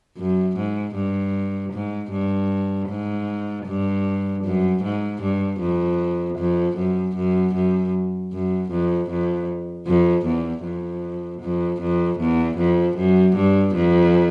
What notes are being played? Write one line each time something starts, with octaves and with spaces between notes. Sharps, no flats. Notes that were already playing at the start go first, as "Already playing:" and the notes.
F#2
G#2
G2
G#2
G2
G#2
G2
F#2
G#2
G2
F2
F2
F#2
F#2
F#2
F#2
F2
F2
F2
E2
F2
F2
F2
E2
F2
F#2
G2
F2